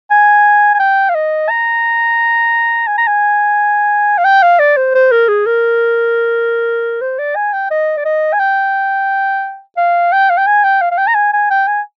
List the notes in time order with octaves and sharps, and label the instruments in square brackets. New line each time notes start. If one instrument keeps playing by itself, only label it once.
[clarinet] G#5
G#5
G5
F5
D#5
A#5
G#5
A#5
G#5
F5
G5
F5
D5
C5
C5
A#4
G#4
A#4
C5
D5
G#5
G5
D#5
D5
D#5
G#5
G5
F5
G5
F5
G5
G#5
G5
F5
F5
G5
A#5
G#5
G#5
G5
G#5